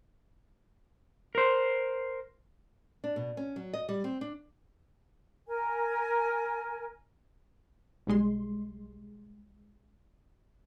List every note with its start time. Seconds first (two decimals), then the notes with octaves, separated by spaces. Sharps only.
1.35 A#4 C5
3.04 D4
3.16 B2
3.37 C#4
3.56 F#3
3.73 D#5
3.89 G3
4.04 C4
4.21 D4
5.48 A#4 G#5
8.07 B1 G3 G#3 C6